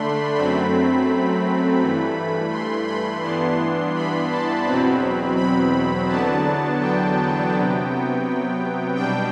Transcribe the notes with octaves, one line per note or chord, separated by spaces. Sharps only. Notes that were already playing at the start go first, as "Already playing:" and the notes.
Already playing: D3 A3 D4 B5 C6
F#2 F#3 A3 C4 B5
G2 E3 A3
C6
B5
G2 E3 B3 D4 C6
B5
A5
E2 B2 F#3 C4 B5
B5
E2 D3 F#3 B3 D4 A5
G5
C3 F#3 B3
B2 G3 D4 G5